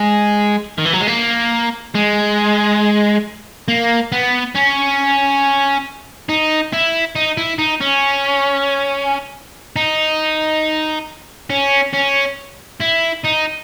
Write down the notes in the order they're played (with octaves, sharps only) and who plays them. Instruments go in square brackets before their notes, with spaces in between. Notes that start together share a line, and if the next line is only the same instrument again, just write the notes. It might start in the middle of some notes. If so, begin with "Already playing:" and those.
Already playing: [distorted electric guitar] G#3
D#3
E3
F#3
G#3
A#3
G#3
A#3
B3
C#4
D#4
E4
D#4
E4
D#4
C#4
D#4
C#4
C#4
E4
D#4